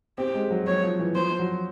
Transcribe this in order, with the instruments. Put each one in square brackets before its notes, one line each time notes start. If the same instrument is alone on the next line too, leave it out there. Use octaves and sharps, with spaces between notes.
[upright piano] C4 [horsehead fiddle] G4
[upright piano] G#3
F#3
[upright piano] F#3 [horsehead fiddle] C#5
[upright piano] F3
E3
[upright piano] F3 [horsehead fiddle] C5
[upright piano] F#3